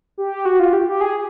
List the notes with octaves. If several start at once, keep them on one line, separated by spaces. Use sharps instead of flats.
G4
F#4
F4
G4
G4
G#4